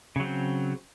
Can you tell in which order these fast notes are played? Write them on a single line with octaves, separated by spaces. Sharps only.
C#3 F#3 C4